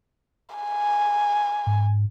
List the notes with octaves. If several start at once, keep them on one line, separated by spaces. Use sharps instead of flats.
G#5
G#2